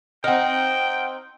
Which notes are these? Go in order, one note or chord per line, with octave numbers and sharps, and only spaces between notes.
C4 D#4 F#5 G5 F6